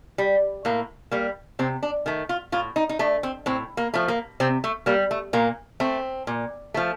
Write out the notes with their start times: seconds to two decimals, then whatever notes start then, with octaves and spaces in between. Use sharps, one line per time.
0.18 G3
0.65 A2 A#3
1.11 G3 A#3
1.59 C3 C4
1.83 D4
2.06 D#3 A3
2.29 F4
2.52 A2 F4
2.76 D#4
2.89 D#4
2.99 A3 D4
3.23 C4
3.46 A2 C4
3.77 A#3
3.94 F3 A3
4.08 A#3
4.40 C3 C4
4.64 A3
4.86 G3 A#3
5.11 A3
5.33 A#2 A#3
5.80 A3 C4
6.27 A#2
6.74 F3 A3